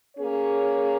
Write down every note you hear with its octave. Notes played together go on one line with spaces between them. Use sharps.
A#3 C#4 G#4 C#5